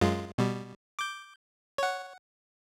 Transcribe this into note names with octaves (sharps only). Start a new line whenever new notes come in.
F#2 G#3 F4
B2 G3
D6 G6
C#5 F#5